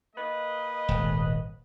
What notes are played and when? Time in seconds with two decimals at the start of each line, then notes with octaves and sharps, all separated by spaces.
0.15 A#3 B4 D#5
0.89 D#1 G#1